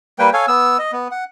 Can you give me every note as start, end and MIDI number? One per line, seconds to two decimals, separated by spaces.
0.19 0.30 55
0.19 0.30 58
0.19 0.30 71
0.19 0.30 79
0.33 0.46 69
0.33 0.46 73
0.33 0.46 77
0.33 0.46 80
0.48 0.77 59
0.48 0.77 88
0.79 0.91 75
0.92 1.08 59
1.11 1.24 78